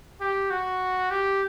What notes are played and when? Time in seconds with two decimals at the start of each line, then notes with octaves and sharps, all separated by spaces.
0.21 G4
0.50 F#4
1.11 G4